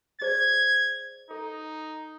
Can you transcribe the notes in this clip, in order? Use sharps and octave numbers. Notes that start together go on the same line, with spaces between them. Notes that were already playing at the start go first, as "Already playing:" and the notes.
G#4 C5 D5 G#6
D#4 A4